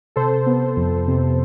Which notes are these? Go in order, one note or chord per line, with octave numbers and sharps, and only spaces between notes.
C3 A4 C5
B3
F2
C3